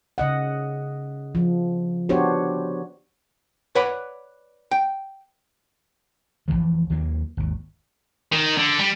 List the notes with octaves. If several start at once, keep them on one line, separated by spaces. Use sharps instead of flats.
C#3 D#5 F#5
F3
B3 D4 F#4 G4 C5 C#5
B4 C#5 D5 F#5 B5
G5
F1 C#3 E3 F3
D#2 D#3 F#3 A#3
G#1 D#2
D#3
D3
G3